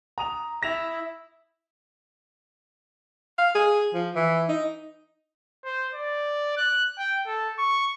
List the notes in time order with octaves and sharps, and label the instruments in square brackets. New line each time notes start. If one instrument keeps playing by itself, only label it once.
[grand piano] A#5 D#6 F7
[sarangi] E4 [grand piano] A#6 E7 F7
[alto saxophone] F5
G#4
F3
E3
D#4
[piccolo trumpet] C5
D5
F#6
G5
A4
C#6